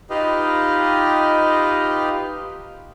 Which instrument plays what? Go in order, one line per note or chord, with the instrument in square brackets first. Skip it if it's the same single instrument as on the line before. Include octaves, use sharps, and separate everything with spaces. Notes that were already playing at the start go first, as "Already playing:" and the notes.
[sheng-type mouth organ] D#4 F4 G4 B4 D#5 F5